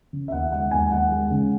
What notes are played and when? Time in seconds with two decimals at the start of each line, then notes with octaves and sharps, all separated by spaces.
0.13 C#3
0.28 E5
0.32 D#2 F#5
0.52 G#3 F#5
0.71 D#2 G#5
0.91 D#2 F#5
1.12 G#3
1.31 C#3